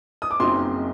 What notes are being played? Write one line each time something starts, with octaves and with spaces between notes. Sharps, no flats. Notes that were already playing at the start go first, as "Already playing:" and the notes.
D#6
D6
F#1 F#2 F#3 C4 D#4 C6